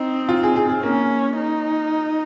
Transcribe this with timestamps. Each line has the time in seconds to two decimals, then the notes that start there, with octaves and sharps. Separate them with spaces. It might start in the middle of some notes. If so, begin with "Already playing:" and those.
Already playing: C4 D#4
0.29 F4
0.43 G#4
0.56 G#4
0.69 G#4
0.83 A#3 C#4
1.37 D#4